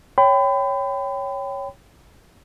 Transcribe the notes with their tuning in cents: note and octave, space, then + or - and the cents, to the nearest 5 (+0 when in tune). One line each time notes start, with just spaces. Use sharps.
C#5 +0 G5 +0 B5 +35